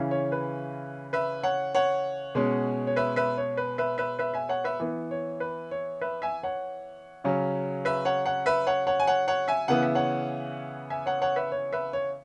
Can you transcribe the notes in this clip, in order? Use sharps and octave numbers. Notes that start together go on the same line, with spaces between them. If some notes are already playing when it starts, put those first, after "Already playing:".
Already playing: C#3 E3 C#4
C#5
B4
B4 E5
C#5 F#5
C#5 F#5
B2 G#3 C#4
C#5
B4 E5
B4 E5
C#5
B4
B4 E5
B4 E5
B4 E5
E5 G#5
C#5 F#5
B4 E5
E3 B3
C#5
B4
C#5
B4 E5
E5 G#5
C#5 F#5
C#3 F#3 C#4
B4 E5
C#5 F#5
C#5 F#5
B4 E5
C#5 F#5
C#5 F#5
G#5
C#5 F#5
C#5 F#5
E5 G#5
C#3 E3 B3 F#5
E5
C#5 F#5
E5 G#5
C#5 F#5
C#5 F#5
B4 E5
C#5
B4 E5
C#5